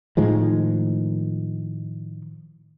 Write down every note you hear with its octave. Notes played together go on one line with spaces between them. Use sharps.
A2 D#3 F3 G#3